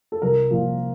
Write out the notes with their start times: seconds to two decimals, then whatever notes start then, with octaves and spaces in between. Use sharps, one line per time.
0.12 A4
0.22 C2 A#4
0.51 A#2 F3